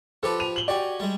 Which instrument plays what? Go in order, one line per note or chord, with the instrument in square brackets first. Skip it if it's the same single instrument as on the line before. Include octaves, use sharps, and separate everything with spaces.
[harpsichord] F3 G4 B4 [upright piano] A4
[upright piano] D#7 F7
F#7 G7
[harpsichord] F#4 G#5 [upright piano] G4 D5
[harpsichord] G3 G#3